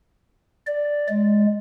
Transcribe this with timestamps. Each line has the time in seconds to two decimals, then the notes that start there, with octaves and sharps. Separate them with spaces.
0.66 D5
1.08 G#3